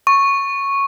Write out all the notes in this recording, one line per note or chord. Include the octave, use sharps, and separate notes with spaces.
C#6